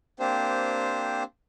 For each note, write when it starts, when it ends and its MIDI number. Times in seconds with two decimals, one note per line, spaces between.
0.20 1.23 58
0.20 1.23 60
0.20 1.23 62
0.20 1.23 67
0.20 1.23 72